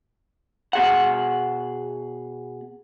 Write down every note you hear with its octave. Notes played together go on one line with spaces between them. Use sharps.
B2 G#4 F#5